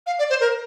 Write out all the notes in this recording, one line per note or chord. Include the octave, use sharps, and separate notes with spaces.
F5
D5
C5
A#4